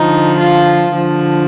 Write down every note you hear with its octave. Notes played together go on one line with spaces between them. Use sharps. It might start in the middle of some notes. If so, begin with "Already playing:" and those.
Already playing: D3 F3 D#4
F4
D3 F3